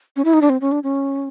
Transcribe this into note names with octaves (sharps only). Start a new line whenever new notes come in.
C#4
E4
D#4
D4
C4
C#4
D4
C#4